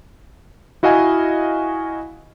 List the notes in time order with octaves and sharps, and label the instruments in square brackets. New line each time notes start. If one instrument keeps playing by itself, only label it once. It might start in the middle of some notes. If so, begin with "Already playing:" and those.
[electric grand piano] E4 F#4 D#5 F5 G#5